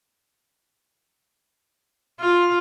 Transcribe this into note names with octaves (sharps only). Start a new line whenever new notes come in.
F4